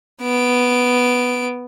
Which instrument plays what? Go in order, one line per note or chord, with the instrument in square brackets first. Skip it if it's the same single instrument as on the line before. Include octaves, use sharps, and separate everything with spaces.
[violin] B3 D7